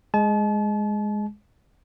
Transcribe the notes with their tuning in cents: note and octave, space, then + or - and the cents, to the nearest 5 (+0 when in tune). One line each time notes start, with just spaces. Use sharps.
G#3 +0 A5 -40